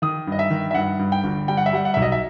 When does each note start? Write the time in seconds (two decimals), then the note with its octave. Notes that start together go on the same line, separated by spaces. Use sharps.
0.02 D#3 D#6
0.27 G2
0.32 D#5
0.39 E5
0.50 D#3
0.71 E5
0.75 G2 F#5
0.99 G2
1.12 G5
1.24 G1
1.48 G3 G5
1.57 F#5
1.66 E5
1.73 G3 F#5
1.85 F#5
1.94 B1 E5
2.02 D#5
2.12 E5